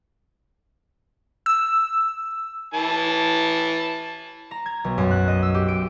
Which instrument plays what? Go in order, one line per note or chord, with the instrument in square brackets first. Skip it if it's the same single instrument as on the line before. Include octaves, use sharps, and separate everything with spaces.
[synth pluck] E6
[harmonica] E3 A5
[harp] A#5
G#6
B1
F#2
F#6
D#5
E6
G4
D7